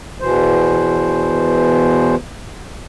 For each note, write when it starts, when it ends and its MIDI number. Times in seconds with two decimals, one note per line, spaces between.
0.21 2.15 40
0.21 2.15 47
0.21 2.15 52
0.21 2.15 72